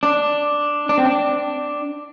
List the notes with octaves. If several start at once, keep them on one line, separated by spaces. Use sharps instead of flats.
D4
D4
C4
D4